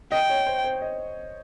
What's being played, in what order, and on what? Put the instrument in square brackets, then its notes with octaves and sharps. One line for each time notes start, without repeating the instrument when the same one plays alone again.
[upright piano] D#5 [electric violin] G5
[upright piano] C#5
C5
C5
D#5